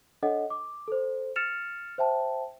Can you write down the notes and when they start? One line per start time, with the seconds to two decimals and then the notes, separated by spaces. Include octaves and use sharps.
0.23 D4 A4 C#5 D#5 F#5
0.50 D6
0.88 A4 C5
1.36 F6 A6 C#7 E7 F7
1.98 C5 E5 G5 A5